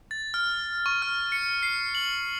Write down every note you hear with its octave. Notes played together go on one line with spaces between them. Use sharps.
A6
F6
C#6
F6
C#7
C7
F#7